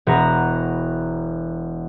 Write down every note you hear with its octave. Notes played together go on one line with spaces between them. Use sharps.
E1 F#4 B4 A#5